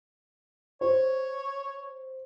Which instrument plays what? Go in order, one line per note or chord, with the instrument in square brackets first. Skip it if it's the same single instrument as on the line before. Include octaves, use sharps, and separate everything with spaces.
[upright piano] C5 [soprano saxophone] C#5